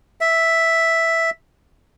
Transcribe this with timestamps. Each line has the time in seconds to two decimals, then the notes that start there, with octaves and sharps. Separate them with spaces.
0.21 E5